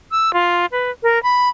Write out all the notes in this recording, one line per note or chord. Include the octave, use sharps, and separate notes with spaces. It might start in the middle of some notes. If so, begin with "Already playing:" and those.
E6
F4
B4
A#4
B5